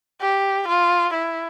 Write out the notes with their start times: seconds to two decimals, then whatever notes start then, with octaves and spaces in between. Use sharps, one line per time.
0.21 G4
0.68 F4
1.14 E4